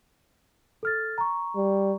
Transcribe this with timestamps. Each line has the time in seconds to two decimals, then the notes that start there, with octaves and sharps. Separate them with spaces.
0.83 A4 F6 A6
1.18 A#5 C#6
1.56 G3